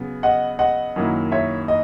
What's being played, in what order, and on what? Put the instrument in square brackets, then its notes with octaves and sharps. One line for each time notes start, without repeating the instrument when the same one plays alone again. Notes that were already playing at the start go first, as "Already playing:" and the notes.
Already playing: [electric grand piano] C#3 F#3 B3
[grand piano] D#5 F#5
D#5 F#5
[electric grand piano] F#2 D#3 F#3 A#3 E4
[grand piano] C#5 E5
D#5